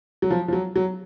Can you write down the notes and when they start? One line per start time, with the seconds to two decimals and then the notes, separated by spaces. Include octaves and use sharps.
0.22 F#3
0.30 F3
0.48 F3
0.53 F#3
0.76 F#3